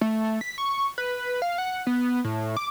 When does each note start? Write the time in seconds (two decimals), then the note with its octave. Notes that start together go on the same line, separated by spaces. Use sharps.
0.01 A3
0.41 B6
0.58 C#6
0.98 B4
1.42 F5
1.58 F#5
1.87 B3
2.24 A2
2.57 D6